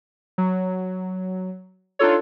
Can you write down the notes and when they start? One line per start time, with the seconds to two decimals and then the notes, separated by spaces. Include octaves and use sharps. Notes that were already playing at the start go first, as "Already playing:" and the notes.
0.38 F#3
1.99 D4 D#4 F4 A4 C#5